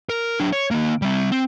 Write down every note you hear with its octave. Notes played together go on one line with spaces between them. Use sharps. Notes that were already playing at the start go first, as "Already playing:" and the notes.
A#4
F#3 D4
C#5
D#3 A#3
G3 C4
C4